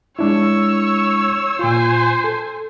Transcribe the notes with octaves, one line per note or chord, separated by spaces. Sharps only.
G#3 D4 E4 C#5 E6
A#2 F4 C5 G#5
A4